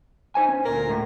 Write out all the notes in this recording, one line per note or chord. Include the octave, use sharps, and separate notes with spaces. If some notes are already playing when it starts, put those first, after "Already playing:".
D#4 C5 G#5
C#4
D2 A#2 A#4
A2